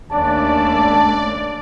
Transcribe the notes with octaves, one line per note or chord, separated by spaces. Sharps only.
D#2 C#3 A3 D4 D5 A5